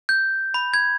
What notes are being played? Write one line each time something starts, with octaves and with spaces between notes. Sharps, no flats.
G6
B5
G#6